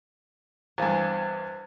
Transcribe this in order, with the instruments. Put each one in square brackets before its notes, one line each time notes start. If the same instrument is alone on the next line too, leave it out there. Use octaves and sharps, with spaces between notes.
[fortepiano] E2 G2 [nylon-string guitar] C5 F5 G#5